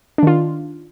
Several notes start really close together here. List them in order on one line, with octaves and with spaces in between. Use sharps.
D4 D#3 F4